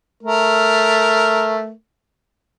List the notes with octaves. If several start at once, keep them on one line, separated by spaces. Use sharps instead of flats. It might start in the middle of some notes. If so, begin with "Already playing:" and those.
A3 A#4